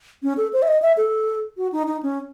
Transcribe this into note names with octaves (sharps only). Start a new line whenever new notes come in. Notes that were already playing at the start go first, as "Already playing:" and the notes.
C#4
A4
C5
E5
D#5
E5
A4
F#4
D#4
D#4
C#4